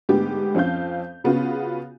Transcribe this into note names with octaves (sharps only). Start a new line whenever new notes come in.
G#2 D3 A3 B3 G4
F2 C4 C#4 F5 G6
C#3 B3 C#4 F4 F#4